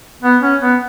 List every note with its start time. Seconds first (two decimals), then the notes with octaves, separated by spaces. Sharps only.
0.22 B3
0.42 C#4
0.61 B3